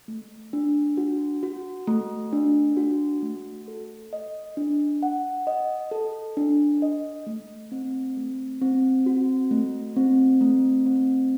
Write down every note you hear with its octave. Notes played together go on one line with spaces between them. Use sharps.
A3
D4
F#4
F#4
A3
D4
F#4
A3
A4
D#5
D4
F#5
D#5
A4
D4
D#5
A3
C4
A3
C4
F#4
A3
C4
A3
C4